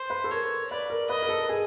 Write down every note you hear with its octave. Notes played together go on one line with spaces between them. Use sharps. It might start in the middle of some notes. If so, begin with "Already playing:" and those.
Already playing: C5
B4
A4
A#4 C#5
B4 D5
A#4
B4 D#5
A#4
A4
G#4